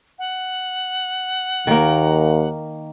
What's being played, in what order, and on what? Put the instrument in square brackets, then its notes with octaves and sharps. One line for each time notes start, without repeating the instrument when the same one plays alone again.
[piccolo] F#5
[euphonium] D#2 [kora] D#3 A#3